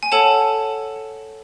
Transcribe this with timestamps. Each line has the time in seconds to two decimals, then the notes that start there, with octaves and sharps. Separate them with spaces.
0.03 G#5
0.12 A4 C#5 F#5 A5